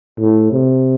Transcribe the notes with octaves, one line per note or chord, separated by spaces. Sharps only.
A2
C3